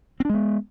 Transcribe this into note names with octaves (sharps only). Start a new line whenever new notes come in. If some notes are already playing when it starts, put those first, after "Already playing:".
G#3 B3 C4 D4